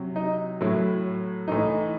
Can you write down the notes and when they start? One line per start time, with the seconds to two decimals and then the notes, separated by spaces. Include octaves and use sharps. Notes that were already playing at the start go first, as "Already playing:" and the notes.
Already playing: C3 F#3
0.16 D#4
0.61 A2 F#3 E4
1.48 A2 E3 D#4